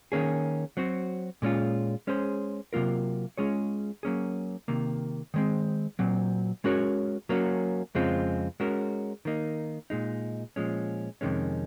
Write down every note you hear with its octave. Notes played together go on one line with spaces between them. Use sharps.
D#3 A#3 C#4 G#4
F#3 C4 F#4
A#2 G#3 C#4 F4
G#3 C#4 G#4 C5
C3 F#3 A#3 F4 A#4
G#3 C#4 F4 G#4 C#5
F#3 A#3 C#4 G#4
C3 D#3 A#3
D#3 G#3 C4
A#2 F#3 C4
G#3 C#4 F#4 A#4 C#5
F#3 A#3 C#4 F#4
F2 C#3 G#3 C4 F4
G#3 C#4 F#4 A#4
D#3 A#3 D#4
A#2 G#3 D#4
A#2 F3 G#3 C#4
F2 C3 D#3 G#3 C#4